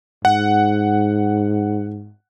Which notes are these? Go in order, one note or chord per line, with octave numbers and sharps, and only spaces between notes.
G#2 F#5